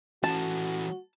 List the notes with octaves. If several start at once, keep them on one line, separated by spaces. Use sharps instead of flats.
E3 C#4 F#4 A5